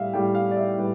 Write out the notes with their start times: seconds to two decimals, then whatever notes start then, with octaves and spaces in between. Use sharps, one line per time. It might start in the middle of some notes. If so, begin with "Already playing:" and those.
Already playing: A2 G3 E5 F5
0.14 A2 G3 G5
0.35 F5
0.51 D5
0.57 E5
0.78 A2 G3 B4